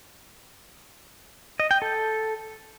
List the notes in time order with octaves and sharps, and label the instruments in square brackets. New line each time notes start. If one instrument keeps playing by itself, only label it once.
[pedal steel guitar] D#5
G5
A4